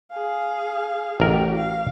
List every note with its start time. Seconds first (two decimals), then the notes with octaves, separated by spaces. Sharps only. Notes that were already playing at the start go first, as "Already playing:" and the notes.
0.11 G#4 F5
1.20 A1 F#4 G4 A#4
1.57 F5